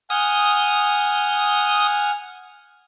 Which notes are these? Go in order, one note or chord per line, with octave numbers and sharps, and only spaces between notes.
F#5 G#5 D#6 F6